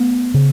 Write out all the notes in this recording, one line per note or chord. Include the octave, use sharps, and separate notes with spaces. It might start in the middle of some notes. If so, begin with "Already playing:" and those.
Already playing: A3 B3
C#3